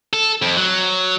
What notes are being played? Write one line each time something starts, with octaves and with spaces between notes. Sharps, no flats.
A4
F2
F#3